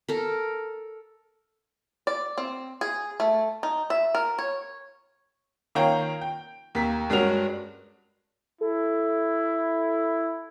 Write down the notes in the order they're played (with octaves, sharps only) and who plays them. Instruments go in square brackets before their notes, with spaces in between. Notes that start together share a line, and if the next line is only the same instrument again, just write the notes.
[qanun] A4 A#4
[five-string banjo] D5
C4
G#4
A3
D#4
E5
A#4
C#5
[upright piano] D#3 A#3 F4 C#5 G5 A#5
G5
D#2 A#3 B6
G2 G#3 C#4 F#4 A#4 F7
[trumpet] E4 [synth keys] A4